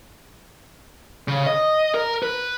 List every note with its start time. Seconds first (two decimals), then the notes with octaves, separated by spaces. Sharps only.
1.28 C#3
1.46 D#5
1.94 A#4
2.22 B4